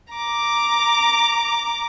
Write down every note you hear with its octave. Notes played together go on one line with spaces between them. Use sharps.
A#5 D6